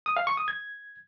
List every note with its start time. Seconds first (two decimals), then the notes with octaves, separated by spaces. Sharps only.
0.06 D#6
0.17 F5
0.27 C#6
0.37 D#6
0.48 G#6